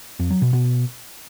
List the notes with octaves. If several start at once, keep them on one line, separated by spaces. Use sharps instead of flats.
F2
F#3
B2
B2